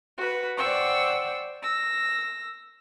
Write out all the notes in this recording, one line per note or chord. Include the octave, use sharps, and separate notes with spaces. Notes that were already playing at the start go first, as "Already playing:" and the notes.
F#4 B4
C5 D5 F#5 G5 C#6 E6
E6 A#6